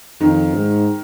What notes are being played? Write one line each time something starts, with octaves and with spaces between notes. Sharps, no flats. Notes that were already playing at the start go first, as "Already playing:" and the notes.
F2 D#3
G#2